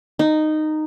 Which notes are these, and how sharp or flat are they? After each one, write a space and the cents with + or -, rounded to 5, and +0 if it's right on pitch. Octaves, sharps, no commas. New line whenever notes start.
D#4 -10